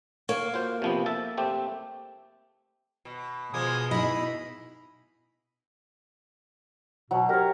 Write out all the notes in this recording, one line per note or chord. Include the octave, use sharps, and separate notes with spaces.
A#3 C#5
F4 F#4 C5
C3 F3 B3
A4 E5 A5
A3 C4 G4
B2
B2 F3 G#3 A#3 G#5 D#6
D#4 E4 D#5 B5
B2 F#3
G4 A#4 C#5